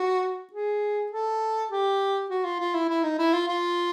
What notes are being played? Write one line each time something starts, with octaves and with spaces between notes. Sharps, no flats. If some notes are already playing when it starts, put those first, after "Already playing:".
Already playing: F#4
G#4
A4
G4
F#4
F4
F4
E4
E4
D#4
E4
F4
F4